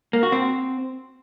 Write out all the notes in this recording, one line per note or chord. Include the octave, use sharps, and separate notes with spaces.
A#3
F#4
C4